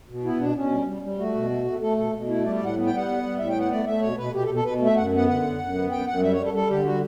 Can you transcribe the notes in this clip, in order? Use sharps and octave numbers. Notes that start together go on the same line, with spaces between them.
B2
B3 E4
B2 D4
B2 C#4
G3
G3
G3
A3 F#4
B2
A3
A3
A3 A4
B2 A4
B2
A3 E4
G3 D5
D5
A2
F#5
B3
G5
G3
F#5
B3
G3
A2 E5
G5
B3
F#5
A3 D5
A3 E5
B2 C#5
B2 B4
B2 G4
A4
B2
A4
B2 B4
A3
E5
F#2 F#5
B3 F#5
D3 F#5
F#2
F#2
B3
F#2 G5
F#2 F#5
G3 E5
C#5
G3
A4
G3 A4
D3 G4
G3 F#4